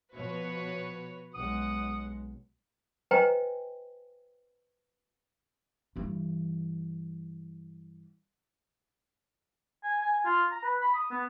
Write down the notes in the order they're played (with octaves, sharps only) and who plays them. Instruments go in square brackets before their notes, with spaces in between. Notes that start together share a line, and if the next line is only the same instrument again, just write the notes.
[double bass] B2 F3 [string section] F#4 B4 C#5
[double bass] B1 G#3 [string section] F#5 [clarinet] D#6
[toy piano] B4 C5 D#5 G5 G#5 A#5
[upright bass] G2 E3
[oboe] G#5
G#5
G#5
F4
A#5
B4
B5
D#6
B3